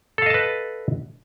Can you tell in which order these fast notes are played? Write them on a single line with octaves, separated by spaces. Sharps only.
A4 F5 D#5 A5 B4